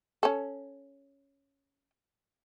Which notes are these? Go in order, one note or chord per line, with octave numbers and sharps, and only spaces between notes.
C#4 A4